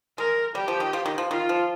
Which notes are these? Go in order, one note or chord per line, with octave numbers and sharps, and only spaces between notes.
G#3 A#4
G3 G4
F3
D#3
F3
D#3
F3
D#3 F4
F3